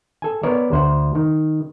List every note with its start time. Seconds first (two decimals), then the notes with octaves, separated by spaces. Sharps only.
0.22 A4 G#5
0.43 B3 A#4 C#5 D5
0.72 D2 C5 F#5
1.15 D#3